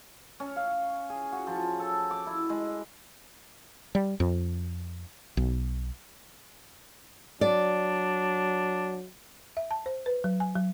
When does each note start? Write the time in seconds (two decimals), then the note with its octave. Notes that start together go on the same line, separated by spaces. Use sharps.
0.40 C#4
0.56 F5
1.10 G#4
1.32 F#4
1.47 F3
1.79 A4
2.11 D6
2.27 E4
2.49 G#3
3.95 G3
4.20 F2
5.37 B1
7.41 F#3 D4 D5
9.57 E5
9.71 A5
9.86 C5
10.06 B4
10.24 F#3
10.40 G#5
10.55 F#3